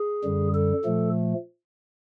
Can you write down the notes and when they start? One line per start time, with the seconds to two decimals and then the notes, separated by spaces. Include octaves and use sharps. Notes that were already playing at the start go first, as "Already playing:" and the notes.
Already playing: G#4
0.24 F#2 D3 G3
0.54 A4
0.85 A#2 F3 A3